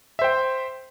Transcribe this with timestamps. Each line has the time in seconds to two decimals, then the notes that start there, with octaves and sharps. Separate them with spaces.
0.19 E5
0.22 C5
0.24 G5